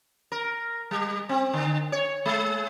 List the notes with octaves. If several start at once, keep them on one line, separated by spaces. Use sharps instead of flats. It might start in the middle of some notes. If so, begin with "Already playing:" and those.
A#4
G3
C4
D3
C#5
G#3